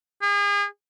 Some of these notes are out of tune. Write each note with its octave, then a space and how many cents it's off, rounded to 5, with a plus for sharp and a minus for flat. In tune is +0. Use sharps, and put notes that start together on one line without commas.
G#4 -40